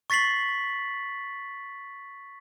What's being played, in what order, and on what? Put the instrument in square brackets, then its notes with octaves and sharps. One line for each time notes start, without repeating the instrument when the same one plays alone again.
[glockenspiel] C#6 A6 B6 C7 F#7